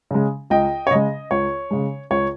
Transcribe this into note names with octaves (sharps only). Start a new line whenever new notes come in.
C#3 G#3
C#2 D#5 G5
C#5
C#3 G#3 D#5
C#2 C#5
C#3 G#3
C#2 C#5